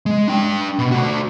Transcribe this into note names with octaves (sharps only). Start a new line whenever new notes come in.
G#3
D4 G5
B2
A3 F#4